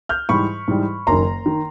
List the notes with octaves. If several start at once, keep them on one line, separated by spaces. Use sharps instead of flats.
F6 G6
G#2 E3 G3 B5 C#6
G#2 E3 G3
F#1 F#2 D#3 A#5 C6
D#3